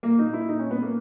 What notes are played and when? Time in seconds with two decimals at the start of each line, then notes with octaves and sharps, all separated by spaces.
0.03 A#2 A#3
0.18 D#4
0.26 A#2
0.33 E4
0.48 A#2 D#4
0.59 C#4
0.71 A#2 B3
0.82 A#3